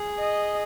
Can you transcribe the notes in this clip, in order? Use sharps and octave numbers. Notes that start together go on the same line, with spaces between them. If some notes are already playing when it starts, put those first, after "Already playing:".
Already playing: G#4
D#5